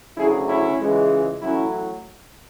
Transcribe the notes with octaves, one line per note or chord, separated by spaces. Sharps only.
D2 C#3 F#3 E4 G#4
C#4 E4
C#2 C#3 E3 G#3
A1 A2 F#3 C#4 E4